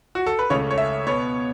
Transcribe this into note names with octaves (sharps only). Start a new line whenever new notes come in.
F#4
A4
B4
C#2 C#3 A3 C#4 C#5
C#5
E5
B2 B3 C#5